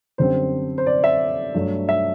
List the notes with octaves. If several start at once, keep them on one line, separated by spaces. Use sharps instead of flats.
F#2 D3 G3 C4 C5
C5
D5
E5
G2 F#3 A3 D4
E5